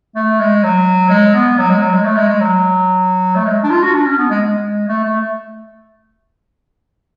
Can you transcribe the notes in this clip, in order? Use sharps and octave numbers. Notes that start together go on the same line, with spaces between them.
A3
G#3
F#3
G#3
B3
F#3
G#3
F#3
G#3
A3
G#3
G#3
F#3
A3
G#3
D4
F4
F#4
D4
C#4
B3
G#3
G#3
A3
A3